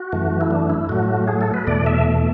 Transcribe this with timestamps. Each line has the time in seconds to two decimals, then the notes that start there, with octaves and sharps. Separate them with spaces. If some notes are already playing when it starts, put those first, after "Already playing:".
Already playing: F#4
0.13 F#2 E3 A3
0.41 E4
0.51 D4
0.70 E4
0.89 A2 F#3 A3 F#4
1.28 G#4
1.41 A4
1.54 B4
1.67 E2 B2 A3 D5
1.86 E5